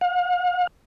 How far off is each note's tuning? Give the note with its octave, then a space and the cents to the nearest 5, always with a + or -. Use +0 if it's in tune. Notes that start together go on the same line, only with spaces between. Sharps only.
F5 +45